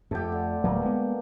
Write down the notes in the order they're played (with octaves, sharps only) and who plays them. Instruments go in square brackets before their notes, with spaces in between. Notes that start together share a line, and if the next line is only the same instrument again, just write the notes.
[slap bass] F2 [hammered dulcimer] A3 G4
[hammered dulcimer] D3
[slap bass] D1 F#3 [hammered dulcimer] B2 A#3
[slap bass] G#3 B3